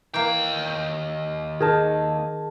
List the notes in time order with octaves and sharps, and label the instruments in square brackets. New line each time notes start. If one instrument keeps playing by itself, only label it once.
[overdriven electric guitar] D#2 G5 [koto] E3 A#3
[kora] D#3 [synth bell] G#4 A#4 A5